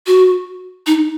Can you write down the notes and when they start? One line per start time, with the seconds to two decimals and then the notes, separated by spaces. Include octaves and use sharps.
0.07 F#4
0.86 D#4